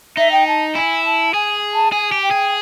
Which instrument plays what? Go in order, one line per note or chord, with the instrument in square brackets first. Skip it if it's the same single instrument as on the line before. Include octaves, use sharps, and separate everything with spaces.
[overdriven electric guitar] D#4 [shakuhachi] E5
[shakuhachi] G5
A5
[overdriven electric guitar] E4 [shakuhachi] G#5
[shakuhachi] A5
[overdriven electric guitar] G#4 [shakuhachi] G#5
[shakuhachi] A5
[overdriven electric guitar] G#4 [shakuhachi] G#5
[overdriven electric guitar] G4
[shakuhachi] G5
[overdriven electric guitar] G#4